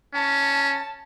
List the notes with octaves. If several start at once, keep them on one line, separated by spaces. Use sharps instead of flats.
C#4 A5